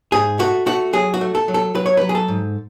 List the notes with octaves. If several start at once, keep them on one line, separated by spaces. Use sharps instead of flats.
G#2 G#4
A3 F#4
A3 F#4
F#3 G#4
F#4
A3
A4
F#3
A4
F#3 B4
C#5
F#3 B4
G#4
A4
G#2